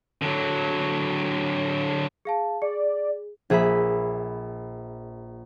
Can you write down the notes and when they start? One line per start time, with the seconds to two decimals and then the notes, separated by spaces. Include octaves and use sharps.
0.22 D3 F#3
2.25 G#4 F5 A5
2.62 G#4 D5
3.50 A#1 G#4 E5 B5 B6